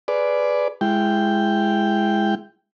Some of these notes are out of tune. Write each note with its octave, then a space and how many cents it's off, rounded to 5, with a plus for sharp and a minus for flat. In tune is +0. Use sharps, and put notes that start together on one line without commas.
G#4 +20 B4 +10 D5 +0
G#3 +0 E4 +25 G5 +0